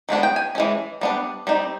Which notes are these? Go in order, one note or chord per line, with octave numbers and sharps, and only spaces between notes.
D#3 G#3 B3 D4
G5
G#5
E3 G#3 C#4
G3 B3 D4
G3 C4 D#4